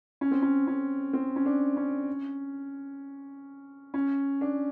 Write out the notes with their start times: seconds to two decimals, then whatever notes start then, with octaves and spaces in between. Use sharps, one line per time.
0.21 C#4
0.31 C4
0.42 C#4
0.67 C#4
1.13 C4
1.36 C#4
1.46 D4
1.77 C#4
3.94 C#4
4.41 D4